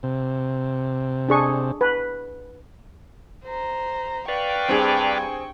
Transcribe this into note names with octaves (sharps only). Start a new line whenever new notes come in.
C3
D4 G#4 C#6
B4
C5 A#5
B4 D5 F5 G5 C#6
G2 C4 G#4